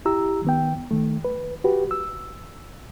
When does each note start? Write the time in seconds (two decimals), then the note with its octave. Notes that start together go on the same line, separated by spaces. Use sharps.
0.05 E4 G4 A#5 E6
0.45 D#3 B3 G5
0.91 D#3 A3
1.25 B4
1.64 F#4 G4 B4
1.91 E6